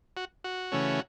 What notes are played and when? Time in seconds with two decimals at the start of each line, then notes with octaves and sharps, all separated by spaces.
0.17 F#4
0.44 F#4
0.72 C#3 E3 A3 C#4